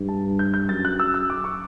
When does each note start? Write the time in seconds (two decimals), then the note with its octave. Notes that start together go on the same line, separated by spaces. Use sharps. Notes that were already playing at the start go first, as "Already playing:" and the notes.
Already playing: G2
0.08 A5
0.39 G6
0.54 G6
0.69 F#2 A6
0.85 F#6
1.00 E6
1.14 E6
1.30 D6
1.44 C#6